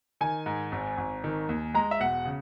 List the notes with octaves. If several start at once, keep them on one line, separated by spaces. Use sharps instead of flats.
D#3 G#5
G#2
G#1
G#1
D#3
D#2
G#3 A#5
E5
E1 F#5
C#3